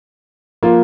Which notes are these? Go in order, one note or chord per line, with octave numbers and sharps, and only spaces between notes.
F3 A#3 F4